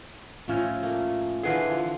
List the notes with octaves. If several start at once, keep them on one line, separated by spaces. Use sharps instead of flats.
A2 F3 C#4 F4 E5
A3 A#3
D3 E3 G#4 B4 C5 F5
F3